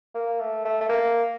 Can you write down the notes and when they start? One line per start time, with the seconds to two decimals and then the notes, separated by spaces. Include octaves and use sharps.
0.15 A#3
0.40 A3
0.65 A3
0.81 A3
0.89 A#3